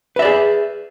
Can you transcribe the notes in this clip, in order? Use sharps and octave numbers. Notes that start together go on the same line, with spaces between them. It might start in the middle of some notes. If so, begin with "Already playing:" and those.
G#4 B4 D5 E5